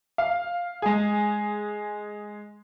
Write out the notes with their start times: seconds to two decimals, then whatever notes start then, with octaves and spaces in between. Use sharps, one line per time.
0.18 F5
0.82 G#3 G#4